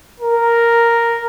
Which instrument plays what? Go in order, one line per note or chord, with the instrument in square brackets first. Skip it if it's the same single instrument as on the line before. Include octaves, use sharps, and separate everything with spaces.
[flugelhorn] A#4